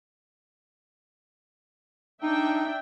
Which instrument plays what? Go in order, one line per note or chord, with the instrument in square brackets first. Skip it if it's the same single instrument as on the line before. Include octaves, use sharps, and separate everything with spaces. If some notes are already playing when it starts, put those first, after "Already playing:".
[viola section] D4 E5 G5 [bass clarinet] D#4